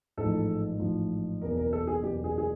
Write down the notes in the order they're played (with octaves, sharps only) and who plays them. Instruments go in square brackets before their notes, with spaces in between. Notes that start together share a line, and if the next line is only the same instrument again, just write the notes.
[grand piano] A1 G#2 F3 A4
A1 G#2 F3
F#1 E2 B2 A#4
A#4
A4
G#4
F#1 E2 B2 G4
G#4
G#4